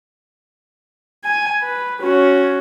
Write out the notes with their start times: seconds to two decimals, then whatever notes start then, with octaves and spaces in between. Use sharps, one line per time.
1.24 G#5
1.62 B4
2.02 C#4 F#4